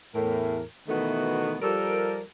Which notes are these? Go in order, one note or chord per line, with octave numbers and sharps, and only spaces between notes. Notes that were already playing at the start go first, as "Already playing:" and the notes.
E2 A2 A#4
B2 D#3 E3 A3 B3 F#4
F3 G3 G4 A4 A#4